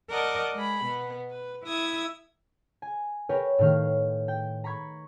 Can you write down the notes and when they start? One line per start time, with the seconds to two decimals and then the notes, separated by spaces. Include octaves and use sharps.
0.10 A#4 D5 D#5 F#5 A5
0.54 G#3 G#4 B5
0.84 B2 B3
1.30 B4
1.64 E4 E5 D#6 G#6
2.82 G#5
3.29 A#4 B4 C#5 G5 A#5
3.59 A2 D#3 F5
4.28 G5
4.64 A#5 B5 C#6 G#6